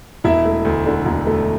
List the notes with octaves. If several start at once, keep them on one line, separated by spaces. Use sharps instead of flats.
E1 E4 E5
A3
D2
D3
E1
A3